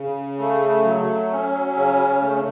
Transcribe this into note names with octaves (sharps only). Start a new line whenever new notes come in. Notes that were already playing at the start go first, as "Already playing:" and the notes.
Already playing: C#3
A3
F#3
C#4
C#3
A3